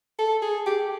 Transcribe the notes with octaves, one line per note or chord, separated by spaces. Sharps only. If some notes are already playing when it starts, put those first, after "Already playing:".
A4
G#4
G4